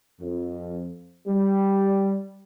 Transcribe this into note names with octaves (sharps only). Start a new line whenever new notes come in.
F2
G3